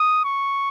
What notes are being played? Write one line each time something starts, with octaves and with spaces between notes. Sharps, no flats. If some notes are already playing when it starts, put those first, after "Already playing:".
Already playing: D#6
C#6